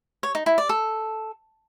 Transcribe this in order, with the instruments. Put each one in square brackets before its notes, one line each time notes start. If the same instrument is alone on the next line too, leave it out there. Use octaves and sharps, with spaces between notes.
[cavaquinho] C#5
D#4
E4
D5
A4